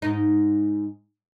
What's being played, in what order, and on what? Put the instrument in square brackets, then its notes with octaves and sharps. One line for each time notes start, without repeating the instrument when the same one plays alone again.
[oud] G#2 D#4